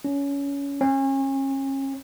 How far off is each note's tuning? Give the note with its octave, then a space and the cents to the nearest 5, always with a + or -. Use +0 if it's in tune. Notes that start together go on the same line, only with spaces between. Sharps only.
C#4 +20
C#4 -35